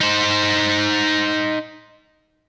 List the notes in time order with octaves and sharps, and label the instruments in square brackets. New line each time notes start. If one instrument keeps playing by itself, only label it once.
[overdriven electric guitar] D#4 C5